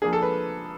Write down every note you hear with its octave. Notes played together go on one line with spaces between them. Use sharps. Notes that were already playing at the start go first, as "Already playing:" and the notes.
F3 A#3 D4 G#4
A4
B4